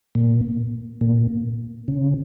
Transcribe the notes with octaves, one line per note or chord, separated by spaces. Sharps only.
A#2
A#2
C#3